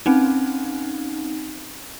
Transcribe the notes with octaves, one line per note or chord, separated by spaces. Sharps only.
C4 C#4 D#4